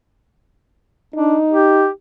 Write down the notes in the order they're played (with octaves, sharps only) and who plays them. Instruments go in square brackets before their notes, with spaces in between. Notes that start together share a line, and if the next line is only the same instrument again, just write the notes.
[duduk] D4 [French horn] D#4
[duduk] G4